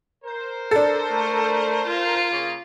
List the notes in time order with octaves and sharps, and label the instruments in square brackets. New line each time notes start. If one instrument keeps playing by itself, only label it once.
[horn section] A#4 C5
[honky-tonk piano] D4 A4
[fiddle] A3
F4
[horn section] C#3 A#3